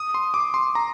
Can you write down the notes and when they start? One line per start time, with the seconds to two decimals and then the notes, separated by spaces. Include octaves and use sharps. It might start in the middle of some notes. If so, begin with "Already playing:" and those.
Already playing: D#6
0.14 C6
0.34 D6
0.54 C6
0.75 A#5